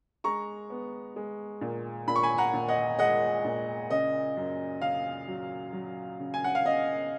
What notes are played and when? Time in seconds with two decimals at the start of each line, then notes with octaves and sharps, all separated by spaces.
0.24 G#3 A#5 C#6
0.70 B3
1.16 G#3
1.61 A#2
2.08 A#2 B5
2.16 C#6
2.23 G#5 B5
2.38 F#5 A#5
2.53 A#2
2.68 D#5 F#5
2.99 G#3 D#5 F#5
3.45 A#2
3.90 C#3 D#5
4.37 F#2
4.82 C#3 F5
5.28 F#3
5.73 F#3
6.20 C#3
6.34 G#5
6.44 F#5
6.55 F5
6.65 C#3 D#5